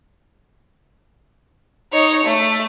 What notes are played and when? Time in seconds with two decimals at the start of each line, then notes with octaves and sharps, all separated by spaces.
1.93 D#4 C#5
2.25 A3